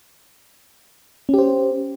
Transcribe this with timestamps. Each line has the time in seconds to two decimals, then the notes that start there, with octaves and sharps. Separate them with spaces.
1.29 C#4
1.34 G4
1.38 C5